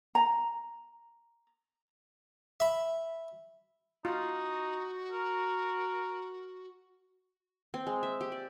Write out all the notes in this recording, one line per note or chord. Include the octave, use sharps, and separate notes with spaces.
A#5
E5 B5
D#4 F4 F#4
A#4
C4
G#3
E5
G4
D5